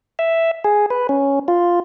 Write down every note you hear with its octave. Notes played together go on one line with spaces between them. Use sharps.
E5
G#4
B4
C#4
F4